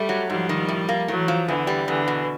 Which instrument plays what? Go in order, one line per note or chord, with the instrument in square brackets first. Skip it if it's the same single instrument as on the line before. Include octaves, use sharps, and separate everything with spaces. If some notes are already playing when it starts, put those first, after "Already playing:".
Already playing: [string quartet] G3 [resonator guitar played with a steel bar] A3
[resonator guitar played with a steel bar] F#3
[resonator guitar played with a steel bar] G#2 [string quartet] F3 G3
[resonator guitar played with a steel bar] D#3
A2
A#3
[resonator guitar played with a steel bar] A2 [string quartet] E3 F#3
[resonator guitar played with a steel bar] F3
[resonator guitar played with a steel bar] E2 [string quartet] D3 E3
[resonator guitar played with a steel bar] G3
[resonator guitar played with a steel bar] E2 [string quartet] D3 E3
[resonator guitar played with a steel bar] B2